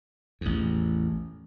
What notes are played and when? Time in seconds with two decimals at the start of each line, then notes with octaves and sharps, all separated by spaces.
0.41 A1 E2